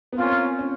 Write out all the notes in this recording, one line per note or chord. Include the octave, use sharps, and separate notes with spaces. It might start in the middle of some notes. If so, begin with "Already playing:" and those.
B3
A#3 C4 C#4 F4
C#4